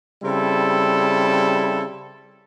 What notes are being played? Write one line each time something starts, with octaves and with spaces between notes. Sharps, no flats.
C#3 G3 C4 E4 A4